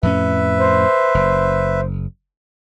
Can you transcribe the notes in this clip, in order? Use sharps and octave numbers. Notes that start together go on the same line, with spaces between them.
F2 A2 C#4 B4 E5
C5
F#1